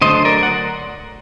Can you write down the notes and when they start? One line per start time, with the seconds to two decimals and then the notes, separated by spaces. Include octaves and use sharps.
0.01 D3 F#3 A3 C5 D#5
0.25 A#4 D5
0.43 F#5